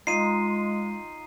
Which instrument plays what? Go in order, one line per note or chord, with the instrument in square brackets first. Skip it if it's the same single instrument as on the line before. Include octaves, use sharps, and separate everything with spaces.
[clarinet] G#3 [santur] D#4 F4 [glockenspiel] C7 D#7